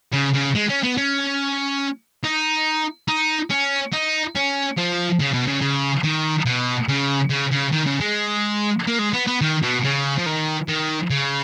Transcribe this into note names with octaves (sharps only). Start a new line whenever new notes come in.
C#3
C#3
G#3
C#4
B3
C#4
D#4
D#4
C#4
D#4
C#4
F3
C#3
B2
C#3
C#3
D#3
B2
C#3
C#3
C#3
D#3
C#3
G#3
A#3
G#3
B3
B3
D#3
B2
C#3
F3
D#3
D#3
C#3